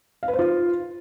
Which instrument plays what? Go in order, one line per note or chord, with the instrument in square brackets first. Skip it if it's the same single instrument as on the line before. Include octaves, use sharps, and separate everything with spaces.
[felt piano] F5
B4
C5
F4